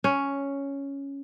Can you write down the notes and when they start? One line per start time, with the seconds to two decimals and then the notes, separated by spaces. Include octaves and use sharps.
0.04 C#4